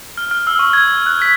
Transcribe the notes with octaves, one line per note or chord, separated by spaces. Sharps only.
F6
F6
E6
C#6
G#6
G#6
F#6
B6